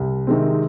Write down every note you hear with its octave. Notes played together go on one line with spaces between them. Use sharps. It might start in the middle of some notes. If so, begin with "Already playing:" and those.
Already playing: C2
C3 D#3 G#3 C4